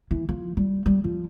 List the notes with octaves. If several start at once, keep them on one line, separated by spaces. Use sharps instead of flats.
E3
F3
G3
G3
F3